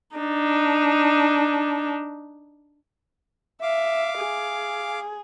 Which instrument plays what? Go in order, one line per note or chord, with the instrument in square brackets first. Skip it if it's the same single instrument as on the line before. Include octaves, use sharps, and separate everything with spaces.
[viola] D4 D#4
[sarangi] E5 [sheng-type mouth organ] F5 D6
[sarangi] G#4